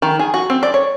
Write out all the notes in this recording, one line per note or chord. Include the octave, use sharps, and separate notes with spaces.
D#3
G#4
F#4
C4
D5
C#5